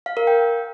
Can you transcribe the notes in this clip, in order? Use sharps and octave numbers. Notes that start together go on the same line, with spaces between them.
F5
A#4
G5